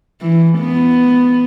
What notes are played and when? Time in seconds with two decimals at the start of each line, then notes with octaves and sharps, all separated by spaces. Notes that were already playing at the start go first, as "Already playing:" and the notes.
0.21 E3
0.58 B3